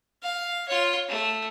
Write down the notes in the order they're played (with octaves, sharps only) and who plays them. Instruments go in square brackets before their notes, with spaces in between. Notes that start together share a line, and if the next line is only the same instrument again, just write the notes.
[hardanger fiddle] F5
F4 C#5
A3